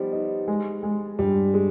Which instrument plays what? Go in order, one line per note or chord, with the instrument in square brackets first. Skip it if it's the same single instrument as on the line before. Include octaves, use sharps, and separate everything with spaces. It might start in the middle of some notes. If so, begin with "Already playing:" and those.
Already playing: [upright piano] F3 G3 [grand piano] B3 D#4
[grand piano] D#4
G#3
G#3
[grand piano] G2 [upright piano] G3
[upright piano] G#3